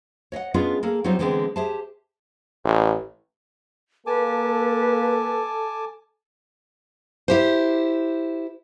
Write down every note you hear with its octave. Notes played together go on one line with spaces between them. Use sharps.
C#5 D#5 F5 F#5
G#3 B3 C#4 D4 F4 G#4
A#3 G#4 A4
F#3 G3 C4 D#4 F4 G4
D3 E3 G#3 A3 B3 C4
G4 G#4 C5 E5 A5
A1
A#3 A4 B4 G#5 A5 D6
E4 G4 C5